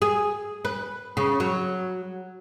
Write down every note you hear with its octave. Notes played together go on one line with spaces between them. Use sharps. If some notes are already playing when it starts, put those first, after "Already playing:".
G#4
B4
C#3
F#3